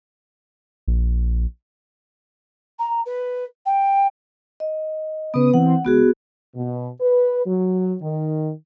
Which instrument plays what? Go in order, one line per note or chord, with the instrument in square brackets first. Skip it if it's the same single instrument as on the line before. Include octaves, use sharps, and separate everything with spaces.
[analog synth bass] A#1
[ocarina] A#5
B4
G5
[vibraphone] D#5
[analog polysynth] C#3 D#6 [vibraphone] B3 B4
[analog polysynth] E3 C4 [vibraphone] F#5
[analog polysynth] C#2 [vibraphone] B3 F#4 G#4
[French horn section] B2
B4
F#3
D#3